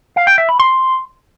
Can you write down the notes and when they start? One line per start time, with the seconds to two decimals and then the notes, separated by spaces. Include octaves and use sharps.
0.16 F5
0.27 G5
0.38 E5
0.49 B5
0.59 C6